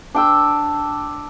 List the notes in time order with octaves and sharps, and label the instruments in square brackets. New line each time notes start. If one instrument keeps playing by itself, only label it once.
[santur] D4 G5 E6